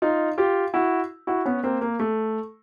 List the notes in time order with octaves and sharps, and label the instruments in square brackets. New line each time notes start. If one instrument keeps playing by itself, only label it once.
[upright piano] D#4 F4
F4 G4
E4 F#4
E4 F#4
B3 C#4
A#3 C4
A#3
A3